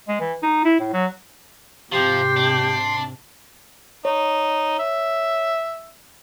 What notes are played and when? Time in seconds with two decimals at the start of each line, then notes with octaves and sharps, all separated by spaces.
0.08 G#3
0.20 E3
0.42 D#4
0.65 E4
0.80 A2
0.93 F#3
1.92 G#2 C3 F3 G4 C6
2.37 D4
4.05 D#4 C#5
4.79 E5